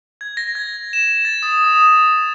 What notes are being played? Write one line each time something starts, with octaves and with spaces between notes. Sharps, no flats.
G#6
A#6
G#6
E7
A6
D#6
D#6